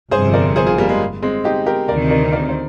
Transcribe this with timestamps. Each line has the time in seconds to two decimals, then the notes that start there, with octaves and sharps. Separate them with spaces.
0.11 G1 F2 C3 G#4 C5
0.34 A#4 D5
0.56 G#4 C5
0.67 F4 G#4
0.78 G3 A#3
0.89 G#3
1.22 G#3 C4
1.44 D#4 G4
1.66 G4 A#4
1.88 D2 C3 D#3 A#4 D5
2.10 A#4 D5
2.33 A#4 D5
2.49 C5